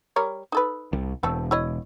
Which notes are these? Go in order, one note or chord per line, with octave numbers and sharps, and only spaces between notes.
G3 A#4 C#5
D#4 A4 B4
C2
E1 A3 C4 A4
E4 C#5 D#5